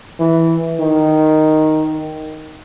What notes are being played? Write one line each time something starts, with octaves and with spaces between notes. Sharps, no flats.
E3
D#3